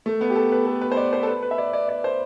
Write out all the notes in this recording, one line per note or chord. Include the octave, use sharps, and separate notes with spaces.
A3
B3
G4
A4
B4
A4
B4
C5
D5
C5
A4
B4
B4
E5
D5
D5
D5
C5